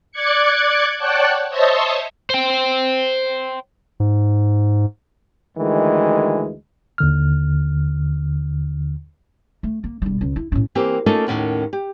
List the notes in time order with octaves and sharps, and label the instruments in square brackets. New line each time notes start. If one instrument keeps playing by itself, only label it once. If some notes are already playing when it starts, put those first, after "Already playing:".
[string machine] D5 D6 F#6 G#6 C#7
C#5 D5 F#5 G5 A5 F#6
C5 C#5 D#5 E5 A5
[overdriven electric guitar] C5 G5
[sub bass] G#2
[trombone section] D2 D#3 E3 G#3
[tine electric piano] D#2 D3 F6
[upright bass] A3
A#3
E1 G3
C#2
E4
A2 C#4
[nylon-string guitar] E3 A#3 C4 G4
A3 A#3 C#4 D#4 F4 A4
D#2 A2 C#4 A#4 F#5
G4